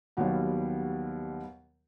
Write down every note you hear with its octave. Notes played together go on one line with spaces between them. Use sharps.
D#2 B2 F#3 G3 B3